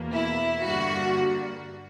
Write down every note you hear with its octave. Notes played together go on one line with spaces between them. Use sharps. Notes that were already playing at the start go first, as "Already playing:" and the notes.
Already playing: E2 B2 A#3
E4
G2 D3 G3 A#3 F#4